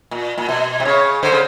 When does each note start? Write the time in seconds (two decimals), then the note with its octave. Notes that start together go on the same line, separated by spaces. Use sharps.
0.11 A#2
0.38 A#2
0.49 B2
0.80 C3
0.85 C#3 C#5
1.23 D3 C5
1.32 C#3